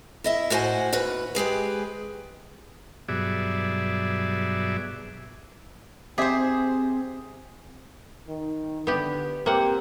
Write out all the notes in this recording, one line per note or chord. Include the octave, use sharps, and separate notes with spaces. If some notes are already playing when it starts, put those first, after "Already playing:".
E4 D#5 E5
A2 F#4 C5 F#5 G#5
D#2 F#4 B4
G#3 G4 G#4 B4
G2 B2 F#3 G#4 D5 E5
C4 G4 G#4 C5 E5
D#3
D3 B3 G4
A#3 C4 G4 F#5